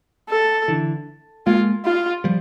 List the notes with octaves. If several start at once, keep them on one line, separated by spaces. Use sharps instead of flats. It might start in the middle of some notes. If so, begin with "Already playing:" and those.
A4
D3 E3
G#3 A#3 F4
F4
F3 G3